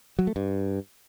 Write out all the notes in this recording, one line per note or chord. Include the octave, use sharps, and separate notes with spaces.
F#3
A3
G2